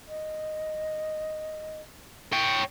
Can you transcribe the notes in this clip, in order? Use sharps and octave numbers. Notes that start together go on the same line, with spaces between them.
D#5
C#5 G5